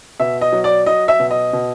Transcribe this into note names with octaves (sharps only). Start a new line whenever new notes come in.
B2 E5
D#5
F#3
D5
F#3 D#5
E5
B2
D#5
B2